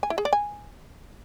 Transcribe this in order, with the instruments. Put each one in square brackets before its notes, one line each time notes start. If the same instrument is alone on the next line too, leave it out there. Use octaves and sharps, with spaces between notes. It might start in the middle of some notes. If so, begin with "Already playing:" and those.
[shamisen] G#5
E4
G#4
D5
G#5